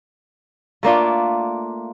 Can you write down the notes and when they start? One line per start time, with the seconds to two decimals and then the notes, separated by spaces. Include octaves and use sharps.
0.83 A3 A#3 D4 F4